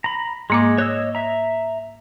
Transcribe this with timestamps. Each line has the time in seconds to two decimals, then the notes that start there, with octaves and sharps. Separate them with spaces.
0.04 A#5 B5
0.50 G#2 G#3 A#3 D6
0.78 C#5 D#5 E6 F#6
1.15 E5 A#5